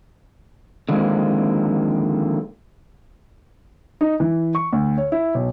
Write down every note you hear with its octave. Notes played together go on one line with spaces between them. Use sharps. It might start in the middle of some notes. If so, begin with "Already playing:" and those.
D3 D#3 F3 G#3 A#3 C4
D#4
E3
C#6
D2
C#5
E4
B1